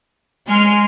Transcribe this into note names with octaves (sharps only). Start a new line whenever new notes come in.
G#3 G#5 C6 F6